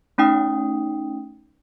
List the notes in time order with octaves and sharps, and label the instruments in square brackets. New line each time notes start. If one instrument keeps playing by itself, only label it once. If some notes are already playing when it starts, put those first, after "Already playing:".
[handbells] A3 C#4 D#4 G5 D#6